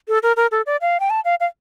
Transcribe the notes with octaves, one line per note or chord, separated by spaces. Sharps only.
A4
A#4
A#4
A4
D5
F5
G5
A5
F5
F5